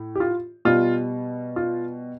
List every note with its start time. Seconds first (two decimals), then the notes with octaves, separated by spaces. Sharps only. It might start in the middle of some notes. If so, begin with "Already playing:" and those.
Already playing: A2
0.15 G4
0.20 F4
0.65 B2 G3 F4
1.56 F4